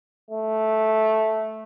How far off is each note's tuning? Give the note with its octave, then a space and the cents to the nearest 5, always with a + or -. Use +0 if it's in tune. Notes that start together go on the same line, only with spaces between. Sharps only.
A3 -10